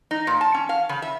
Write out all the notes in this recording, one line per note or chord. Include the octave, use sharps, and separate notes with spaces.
D#4
A#2
A5
C#4
F5
C#3
E5